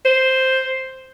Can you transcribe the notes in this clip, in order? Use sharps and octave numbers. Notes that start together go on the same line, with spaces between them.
C5